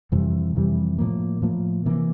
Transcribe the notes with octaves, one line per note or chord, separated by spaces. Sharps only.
F2 C3 E3 G3
F2 C3 E3 G3
A2 F3 A#3
A2 F3 A#3
C3 E3 A#3